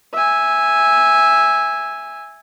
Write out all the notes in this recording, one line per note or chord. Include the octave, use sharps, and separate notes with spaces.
E5 G#5